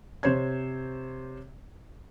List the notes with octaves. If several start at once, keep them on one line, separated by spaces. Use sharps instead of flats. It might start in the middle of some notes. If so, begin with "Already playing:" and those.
C3 C5 C#5 G#6